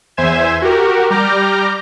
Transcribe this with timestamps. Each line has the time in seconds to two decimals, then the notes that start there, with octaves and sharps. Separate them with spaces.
0.17 E2 C5 E5 G#5 G#6 E7
0.62 F#4 G4 A#4
1.10 G3 A#5 D6 F6 G6 A#6